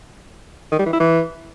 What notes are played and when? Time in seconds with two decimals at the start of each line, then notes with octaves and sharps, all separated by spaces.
0.72 D#3
0.79 G3
0.86 E3
0.93 E4
1.00 E3